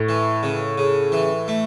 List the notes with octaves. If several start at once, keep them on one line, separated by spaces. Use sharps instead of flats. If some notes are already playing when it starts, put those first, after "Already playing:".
Already playing: A2
E3
C#3
C#3
E3
A3